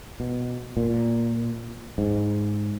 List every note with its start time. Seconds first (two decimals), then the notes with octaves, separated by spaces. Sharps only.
0.20 B2
0.77 A#2
1.98 G#2